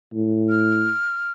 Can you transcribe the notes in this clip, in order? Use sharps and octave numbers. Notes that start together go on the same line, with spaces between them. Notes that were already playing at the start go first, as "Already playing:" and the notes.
A2
F6